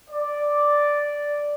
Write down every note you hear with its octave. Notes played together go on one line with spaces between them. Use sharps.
D5